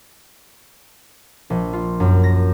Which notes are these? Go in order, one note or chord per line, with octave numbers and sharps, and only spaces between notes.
A#1
F4
F#2
A#6